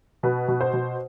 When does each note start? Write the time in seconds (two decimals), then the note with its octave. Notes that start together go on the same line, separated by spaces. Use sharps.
0.23 B2 B4
0.48 B2
0.61 C5
0.73 B2